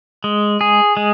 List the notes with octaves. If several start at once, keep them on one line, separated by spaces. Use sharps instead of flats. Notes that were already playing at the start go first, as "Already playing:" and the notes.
G#3
G#4
G#3